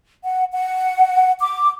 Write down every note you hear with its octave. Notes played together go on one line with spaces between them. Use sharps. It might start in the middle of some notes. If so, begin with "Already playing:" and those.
F#5
F#5
D6